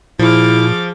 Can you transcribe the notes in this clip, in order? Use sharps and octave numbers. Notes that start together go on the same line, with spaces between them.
A#2 F3 E4 G#4 D6 F6